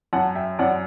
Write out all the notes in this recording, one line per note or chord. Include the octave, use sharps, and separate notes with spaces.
F#2 F#5 A5
E5 G5
F#2 D5 F#5